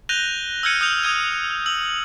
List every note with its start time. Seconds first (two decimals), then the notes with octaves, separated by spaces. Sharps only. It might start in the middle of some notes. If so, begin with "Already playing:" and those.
0.09 F#6 G6 A#6 D#7 F7 G7
0.63 E6 F6 G6 G#6 C#7 D#7
0.81 D#6 F6 G6 F7
1.03 D#6 G#6 D#7
1.66 E6 F#7